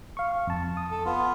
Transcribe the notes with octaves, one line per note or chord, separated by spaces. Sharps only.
F5 C#6
F2 A5
D#6
A4
B3 F4